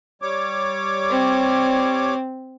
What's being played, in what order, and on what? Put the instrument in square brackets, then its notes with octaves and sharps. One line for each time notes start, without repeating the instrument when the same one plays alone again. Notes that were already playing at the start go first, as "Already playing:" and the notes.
[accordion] G3 C#5 D6
[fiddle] C4